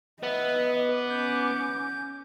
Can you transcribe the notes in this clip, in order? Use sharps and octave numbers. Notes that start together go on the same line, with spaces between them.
B3 B4 D#5 E5
D6
C#4 G6